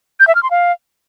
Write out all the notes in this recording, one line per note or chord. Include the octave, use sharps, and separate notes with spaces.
G6
E5
F6
C6
F5